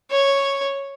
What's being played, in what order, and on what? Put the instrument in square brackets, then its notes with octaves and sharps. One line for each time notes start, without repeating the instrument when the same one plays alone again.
[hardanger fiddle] C#5